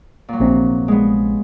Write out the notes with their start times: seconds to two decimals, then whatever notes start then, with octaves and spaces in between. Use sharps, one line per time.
0.28 A#2 F#3
0.40 A#1 C3
0.88 G#3 B3